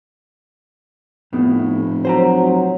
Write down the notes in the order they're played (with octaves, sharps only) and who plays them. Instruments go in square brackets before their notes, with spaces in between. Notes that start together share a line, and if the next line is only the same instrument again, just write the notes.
[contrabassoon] F1 [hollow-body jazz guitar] A2 B3
[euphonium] F#3 [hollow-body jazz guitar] C5 G#5 A#5